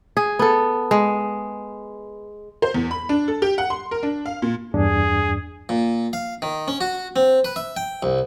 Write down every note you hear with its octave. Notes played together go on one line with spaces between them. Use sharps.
G#4
B3 A4
G#3
C5
E2
B5
D4
A4
G4
F#5
C6
A#4
D4
F5
A#2
E2 G2 D4 G#4
A#2
F5
D#3
C#4
F#4
C4
B4
E5
G5
C2